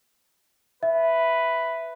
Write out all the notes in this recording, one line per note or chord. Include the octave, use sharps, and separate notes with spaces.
B4 E5